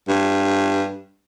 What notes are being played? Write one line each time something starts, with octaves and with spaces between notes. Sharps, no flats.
G2